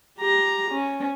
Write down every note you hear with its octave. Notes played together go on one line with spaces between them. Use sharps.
G4 A#5
C#4